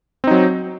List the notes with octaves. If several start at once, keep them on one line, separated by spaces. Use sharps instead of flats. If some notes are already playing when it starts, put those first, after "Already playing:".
F#3 C4 D#4